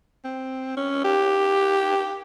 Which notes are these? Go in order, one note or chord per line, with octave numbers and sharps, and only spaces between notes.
C4
C#4
G4